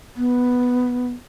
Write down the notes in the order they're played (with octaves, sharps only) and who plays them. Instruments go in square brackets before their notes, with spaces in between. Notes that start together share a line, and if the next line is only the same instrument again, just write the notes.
[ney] B3